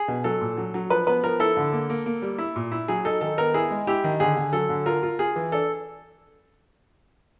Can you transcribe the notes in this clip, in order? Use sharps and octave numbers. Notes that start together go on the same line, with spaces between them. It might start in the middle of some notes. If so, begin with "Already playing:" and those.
Already playing: G#4
B2
F#3 A4
A#2
F#3
F#3
F3 B4
B3 B4
F3 A#4
E4 A4
D3
A#3
A#3
A#3
G3
E4
A#2
E4
F#3 G#4
D#4 A4
D#3 A4
B3 A#4
E4 G#4
G#3
E4 G4
D#3
D3 G#4
D3
F#3 A4
D3
F4 A#4
F4
F4 G#4
E3
D4 A4